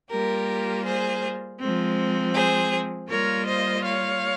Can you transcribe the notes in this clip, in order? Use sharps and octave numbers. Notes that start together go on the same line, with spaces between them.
G3 A#3 F4 G4 A#4
G#4 C5
F3 G#3 C4
G#4 C5
G3 A#3 F4 A#4 C#5
C5 D#5
C#5 F5